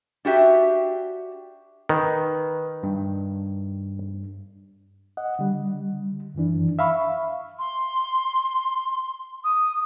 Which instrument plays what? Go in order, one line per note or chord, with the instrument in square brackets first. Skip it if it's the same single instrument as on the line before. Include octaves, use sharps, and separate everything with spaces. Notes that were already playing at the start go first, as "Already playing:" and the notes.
[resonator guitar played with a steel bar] D4 F#4 G4 E5
[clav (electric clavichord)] D#3 [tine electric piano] B4
[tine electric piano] G2
[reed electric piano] D#5 F#5
D3 G3
F#2 D#3 E3 D4
E5 F5 B5 C#6
[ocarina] C6
D#6